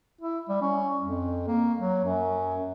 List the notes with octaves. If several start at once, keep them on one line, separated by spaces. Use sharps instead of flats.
E4
G3
C#4
F2
A#3
F#3
F#2